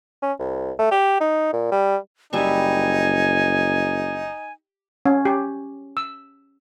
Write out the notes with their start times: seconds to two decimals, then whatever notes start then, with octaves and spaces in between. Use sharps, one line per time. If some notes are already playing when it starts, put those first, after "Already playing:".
0.22 C#4
0.39 C2
0.79 A3
0.91 G4
1.20 D#4
1.53 A#2
1.72 G3
2.33 F#1 G3 D#4 E5 G#5 C#6
5.06 C#4
5.25 G4
5.97 E6